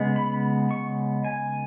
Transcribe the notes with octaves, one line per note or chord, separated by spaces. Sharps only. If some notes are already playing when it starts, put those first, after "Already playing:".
Already playing: C#3 G#3 B3
B5
C#6
G#5